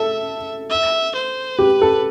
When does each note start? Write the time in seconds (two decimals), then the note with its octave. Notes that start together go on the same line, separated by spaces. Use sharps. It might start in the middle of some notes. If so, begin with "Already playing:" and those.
Already playing: A4 E5
0.70 E5
1.15 C5
1.58 G4 B4
1.82 A4